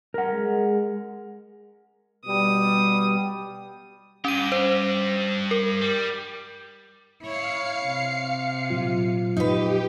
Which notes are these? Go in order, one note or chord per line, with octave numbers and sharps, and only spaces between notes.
A#4 F#5
G#3
B2 G3 D#6
G2 C#4 G4 D#7
C5
A#4
G3
E4 C#5 F5 C7 C#7
C3
A#2 F#3 F4
D#4 G4 B4